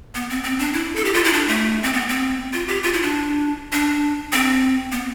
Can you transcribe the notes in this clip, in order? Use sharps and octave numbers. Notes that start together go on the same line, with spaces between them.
B3
C4
C4
D4
E4
A4
G4
F4
E4
D4
A3
C4
B3
C4
F4
G4
F4
E4
D4
D4
C4
B3